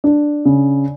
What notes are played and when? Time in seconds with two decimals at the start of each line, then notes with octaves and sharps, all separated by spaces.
0.04 D4
0.45 C#3